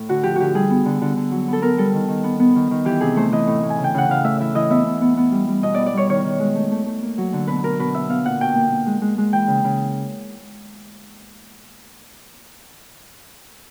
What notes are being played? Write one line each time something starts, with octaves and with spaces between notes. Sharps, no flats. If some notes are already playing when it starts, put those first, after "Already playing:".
Already playing: A2
D3 F#4
F3 G4
D3 F#4 G4
G3 G#4
B3
D3
D3
D3
F#3
B3 A4
B3 A#4
G3 A4
D#3
D#3
B3
B3
D#3
D#3
E3 G4
C3 G#4
A3 C5
E3 D#5
A2
A2
G#5
C#3
G5
C#3 F#5
C#3 F5
A3 E5
E3 E5
E3 D#5
B3 E5
B3
B3
B3
G3
G3
B2 D#5
B3 D5
D5
G3 C#5
D#3 C#5
D#3
G#3
A3
A3
A3
A#3
F#3
D3
B2 B4
B2 A#4
B2 B4
B3 E5
B3 F5
A#2 F#5
B2 G5
A#3
A#3
G#3
G#3
G#3
E3 G5
C#3
C#3